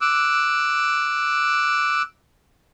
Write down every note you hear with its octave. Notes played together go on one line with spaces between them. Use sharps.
D6 E6 F#6